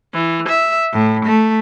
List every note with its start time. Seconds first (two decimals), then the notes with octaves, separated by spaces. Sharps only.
0.14 E3
0.49 E5
0.93 A2
1.26 A3